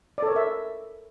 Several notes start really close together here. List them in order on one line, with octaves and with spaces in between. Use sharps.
D5 A4 C#5 A#4 E5